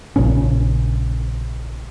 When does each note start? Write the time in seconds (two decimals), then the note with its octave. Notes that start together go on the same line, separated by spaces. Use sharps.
0.16 A#1 A#2 C#3 C#4